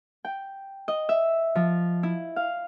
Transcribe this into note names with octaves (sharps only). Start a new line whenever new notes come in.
G5
D#5
E5
F3
E4
F5